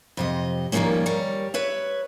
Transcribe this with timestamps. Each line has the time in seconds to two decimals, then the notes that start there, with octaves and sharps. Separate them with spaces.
0.17 F2 C3 D#5
0.72 D#3 F3 G3 A3 A#3 C#4
1.06 G3 A#4 C#5
1.54 B4 C#5 E5